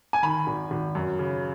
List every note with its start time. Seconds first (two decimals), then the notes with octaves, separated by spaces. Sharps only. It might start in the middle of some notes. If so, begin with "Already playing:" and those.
0.13 G#5
0.23 D#3 B5
0.47 G#1
0.71 G#1
0.95 F#2
1.19 C#3